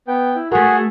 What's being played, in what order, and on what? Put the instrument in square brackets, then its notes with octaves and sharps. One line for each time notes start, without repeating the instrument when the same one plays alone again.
[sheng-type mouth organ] B3 G5
E4
[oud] A3 A#4 [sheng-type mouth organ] F#4 G#4